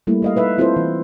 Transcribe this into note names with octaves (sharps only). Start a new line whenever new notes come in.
G3 A3 A#3 E4
A3 D#5 F5
D#4 B4 E5 F5
C4 E4 F4 A4 B4 C5
E3